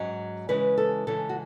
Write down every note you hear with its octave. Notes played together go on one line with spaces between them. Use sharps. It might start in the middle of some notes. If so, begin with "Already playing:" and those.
Already playing: G#2 F#3 C#4 D#5
C#3 E3 G#3 C#4 B4
A4
C#3 E3 G#3 C#4 A4
F#4